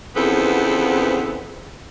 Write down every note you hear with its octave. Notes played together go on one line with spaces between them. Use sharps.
E2 C#3 F3 B3 C4 A4